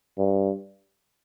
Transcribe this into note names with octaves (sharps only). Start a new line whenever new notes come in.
G2